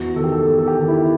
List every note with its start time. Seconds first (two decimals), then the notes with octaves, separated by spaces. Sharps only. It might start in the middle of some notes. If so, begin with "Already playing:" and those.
Already playing: E2 F#4
0.16 D#3 A4
0.24 G4
0.32 A4
0.46 E2 A4
0.58 A4
0.68 G4
0.78 D#3
0.88 E4